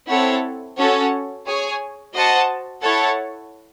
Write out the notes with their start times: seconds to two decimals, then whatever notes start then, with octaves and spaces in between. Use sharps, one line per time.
0.09 C4 E4 A4 C#5 F#5
0.78 C#4 F#4 A4 C#5 F#5
1.46 G#4 C#5 G#5
2.14 F#4 C5 D#5 F#5 A5
2.83 E4 A4 C#5 F#5 A5